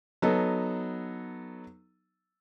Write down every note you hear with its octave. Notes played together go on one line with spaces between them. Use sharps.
F#3 B3 D#4 A4